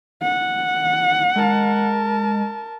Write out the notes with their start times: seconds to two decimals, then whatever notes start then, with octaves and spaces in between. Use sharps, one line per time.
0.22 F#5
1.36 G#3 A#4 A5